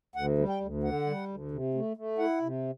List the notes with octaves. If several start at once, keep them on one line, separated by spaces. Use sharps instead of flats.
D2 F#5
G3
G5
D2
D3 F#5
G3
D2
C3
A3
A3
E4 F#5
C3